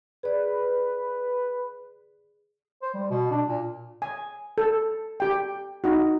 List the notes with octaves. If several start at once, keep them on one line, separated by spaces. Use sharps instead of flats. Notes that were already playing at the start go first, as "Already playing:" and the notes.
G#4 B4 D5
C5
G3
B2
D4
A#2
G#5
A4
G4 G5
D#4 F#4